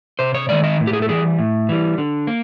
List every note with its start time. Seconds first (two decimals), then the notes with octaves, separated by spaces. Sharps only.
0.19 C3 C5
0.34 C#5
0.49 D#3 G#3 D5
0.64 D#5
0.80 A2
0.87 G4
0.93 G#4
1.02 A4
1.08 E3 G3 G#4
1.39 A2
1.69 E3 G3
1.98 D3
2.27 A#3